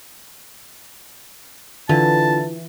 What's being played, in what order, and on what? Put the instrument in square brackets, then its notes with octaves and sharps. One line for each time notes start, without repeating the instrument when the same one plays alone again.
[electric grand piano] D3 [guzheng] E3 [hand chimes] F4 [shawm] A5